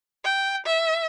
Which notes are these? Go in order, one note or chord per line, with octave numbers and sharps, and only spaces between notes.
G5
E5